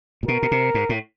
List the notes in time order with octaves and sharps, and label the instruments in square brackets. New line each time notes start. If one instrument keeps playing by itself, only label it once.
[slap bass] A#2
[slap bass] B2 [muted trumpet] A#4
[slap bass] B2
C3
G#2
A2